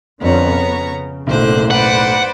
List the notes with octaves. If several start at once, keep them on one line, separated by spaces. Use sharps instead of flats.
F2 D3 B3 C#4 C#5 A#5
C#3
F#1 B1 A2 D3 C5 F#6
B4 C5 D5 F#5